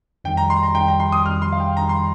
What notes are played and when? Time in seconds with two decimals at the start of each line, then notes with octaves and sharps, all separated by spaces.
0.24 F2 D#3 G3 G5
0.37 A#5
0.50 C6
0.63 A#5
0.75 F2 D#3 G3 G5
0.88 A#5
1.00 C6
1.12 D#6
1.26 F2 D#3 G3 F6
1.42 C6
1.52 F5
1.60 G5
1.76 F2 D#3 G3 A#5
1.89 C6